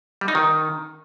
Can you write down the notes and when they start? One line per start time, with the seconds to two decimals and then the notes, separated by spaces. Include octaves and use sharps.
0.21 G3
0.28 D#4
0.35 D#3